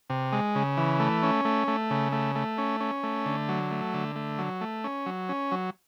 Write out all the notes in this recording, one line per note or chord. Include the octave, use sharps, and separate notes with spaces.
C3
G#3
C#3
E3
A3
C#4
A3
A3
C#3
A3
A3
C#4
C#4
A3
D3
F#3
A3
D3
A3
F#3
A3
C#4
F#3
C#4
F#3